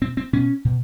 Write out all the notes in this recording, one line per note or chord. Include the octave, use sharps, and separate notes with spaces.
B2 C4
C4
B2 C#4
B2